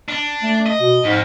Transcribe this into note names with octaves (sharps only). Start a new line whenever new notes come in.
D4
A3
D#5
B2
F2 G#2